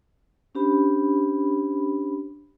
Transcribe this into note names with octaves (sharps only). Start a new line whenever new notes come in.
C#4 D4 G4 C5 B5